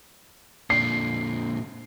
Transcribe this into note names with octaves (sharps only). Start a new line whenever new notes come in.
A#2 D3 C7